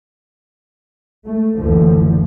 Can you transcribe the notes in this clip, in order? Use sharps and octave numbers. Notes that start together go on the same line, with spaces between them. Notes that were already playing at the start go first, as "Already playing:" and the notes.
A3
F#1 D2 D3 E3 F3